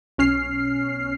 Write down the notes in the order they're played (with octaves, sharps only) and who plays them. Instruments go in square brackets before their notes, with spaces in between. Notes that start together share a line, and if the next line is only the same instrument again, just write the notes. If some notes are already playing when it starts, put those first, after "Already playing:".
[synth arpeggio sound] B1 C#4 F6 C7